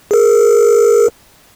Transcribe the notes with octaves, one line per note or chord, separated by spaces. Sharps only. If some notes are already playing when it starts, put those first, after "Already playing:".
G#4 A#4